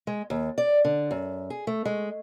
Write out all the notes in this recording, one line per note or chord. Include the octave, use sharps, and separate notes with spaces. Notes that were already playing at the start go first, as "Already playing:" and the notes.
G#3
D#2
D5
D3
F#2
G#4
A3
G#3